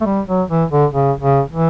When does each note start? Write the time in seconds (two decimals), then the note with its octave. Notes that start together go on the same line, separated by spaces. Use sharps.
0.01 A3
0.06 G3
0.28 F#3
0.49 E3
0.71 D3
0.92 C#3
1.21 C#3
1.50 E3